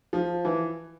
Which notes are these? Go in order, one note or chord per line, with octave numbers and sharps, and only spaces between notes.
F3
E3